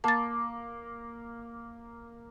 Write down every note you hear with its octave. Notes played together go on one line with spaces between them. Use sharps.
A#3 A5 A6